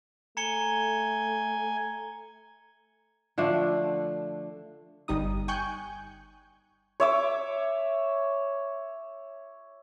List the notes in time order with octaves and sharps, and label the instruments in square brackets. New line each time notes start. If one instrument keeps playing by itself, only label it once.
[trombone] A3 [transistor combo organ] G#5 [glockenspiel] A#5 C#7 G7
[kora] D3 F3 A3 D4
[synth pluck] G1 G3 D#4 D#6
G5 G#5 C#6 F#6 G6
[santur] C#5 E5 D6